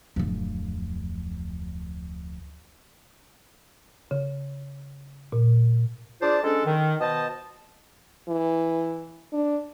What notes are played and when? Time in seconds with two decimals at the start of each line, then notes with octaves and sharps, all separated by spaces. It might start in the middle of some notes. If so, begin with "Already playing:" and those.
0.16 D1 F2
4.11 C#3
5.32 A#2
6.21 D4 F4 G#4 C5 D5 A5
6.44 G#3 C#4 D4 A4
6.65 D#3
7.00 B2 C5 D#5 A5
8.29 E3
9.33 D4